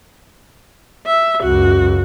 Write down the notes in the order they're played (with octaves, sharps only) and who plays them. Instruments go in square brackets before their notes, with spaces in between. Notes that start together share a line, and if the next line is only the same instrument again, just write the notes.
[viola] E5
[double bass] C#2 F#2 [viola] F#4